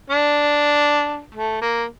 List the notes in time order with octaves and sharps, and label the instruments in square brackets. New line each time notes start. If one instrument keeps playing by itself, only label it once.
[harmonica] D4
A3
A#3